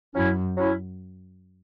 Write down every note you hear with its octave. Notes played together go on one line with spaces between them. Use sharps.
F#2 F#3 C#4 E4
F#3 C#4 E4